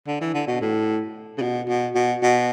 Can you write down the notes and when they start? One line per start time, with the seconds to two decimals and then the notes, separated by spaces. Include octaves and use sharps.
0.07 D3
0.21 E3
0.34 D3
0.47 B2
0.61 A2
1.38 C#3
1.42 B2
1.68 B2
1.95 B2
2.23 B2